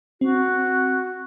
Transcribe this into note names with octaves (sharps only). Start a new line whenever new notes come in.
C4 F#4